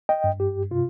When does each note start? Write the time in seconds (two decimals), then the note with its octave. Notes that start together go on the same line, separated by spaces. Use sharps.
0.09 D#5 G5
0.24 G2
0.40 G4
0.71 C3 F4